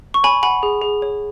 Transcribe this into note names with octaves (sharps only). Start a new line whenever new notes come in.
C#6
C#5 G#5 B5
F#5 G#5 B5
G#4
G#4
C#5